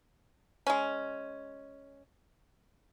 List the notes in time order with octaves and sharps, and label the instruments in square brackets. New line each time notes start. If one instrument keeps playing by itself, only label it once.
[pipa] G#3 C#4